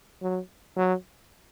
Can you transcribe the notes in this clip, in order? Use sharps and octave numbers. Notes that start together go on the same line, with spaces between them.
F#3
F#3